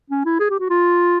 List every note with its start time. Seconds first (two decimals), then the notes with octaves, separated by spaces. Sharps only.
0.10 C#4
0.25 E4
0.40 G#4
0.50 G4
0.60 F#4
0.70 F4